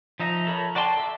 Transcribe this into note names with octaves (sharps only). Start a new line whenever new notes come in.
F3 D#4 E5 A#5
A4 A#4 C#5 B5
F#4 D5 G5 A5 C6
A4 E5